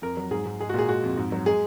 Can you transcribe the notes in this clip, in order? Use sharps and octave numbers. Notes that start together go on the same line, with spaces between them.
F2 A#4
F#3
G#2 G#4
G#2
G#3 G#4
F#4
A#2 G#4
G#3 F#4
F2
G#2
F#3
G#3 G#4